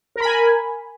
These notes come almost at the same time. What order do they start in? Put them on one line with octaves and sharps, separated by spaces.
A#4 B5 G#5